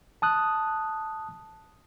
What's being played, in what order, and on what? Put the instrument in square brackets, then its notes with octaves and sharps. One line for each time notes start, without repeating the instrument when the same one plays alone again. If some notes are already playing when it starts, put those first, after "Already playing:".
[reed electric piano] A5 D#6 F#6